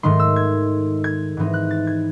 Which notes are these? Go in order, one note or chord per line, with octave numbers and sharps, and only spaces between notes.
G#2 D#3 A3 D#4 C6
E6
G#6
G#6
G#2 E3 C4 D#4
F#6
A6
G#6